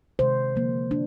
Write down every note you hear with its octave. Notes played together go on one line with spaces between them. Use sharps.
C3 D#3 G#3 C5
D3 F3 A#3
A#3 D4